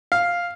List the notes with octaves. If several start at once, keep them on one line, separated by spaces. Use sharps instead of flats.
F5